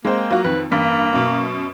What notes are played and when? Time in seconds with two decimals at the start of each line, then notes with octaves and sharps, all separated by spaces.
0.05 G#3 A#3 C4 C5
0.31 F#3 F4 F#4
0.45 F2 D#3 B4
0.72 A1 G2 A#3 B6
1.13 F#2 B2